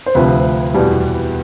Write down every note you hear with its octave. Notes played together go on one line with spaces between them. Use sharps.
C5
D2 C3 F3 B4
E2 B2 G3